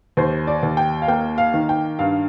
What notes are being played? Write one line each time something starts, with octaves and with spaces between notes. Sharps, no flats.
D#2 C5
D5
D#2
G5
F5
A#3 G5
F5
D#3
G5
G2 F5